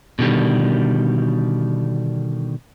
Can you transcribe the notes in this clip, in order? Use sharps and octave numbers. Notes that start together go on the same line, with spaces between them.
B2 D3 D#3 G3